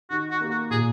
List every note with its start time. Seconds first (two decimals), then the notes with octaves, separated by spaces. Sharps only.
0.10 D#3 F#4
0.31 F#4
0.41 A#3
0.51 F#4
0.71 A#2 G#4